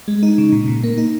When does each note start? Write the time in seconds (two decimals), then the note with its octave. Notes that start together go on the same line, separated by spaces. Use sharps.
0.08 G#3
0.23 D#4
0.38 C#3
0.52 A#2
0.68 A#2
0.84 A#3
0.98 D#4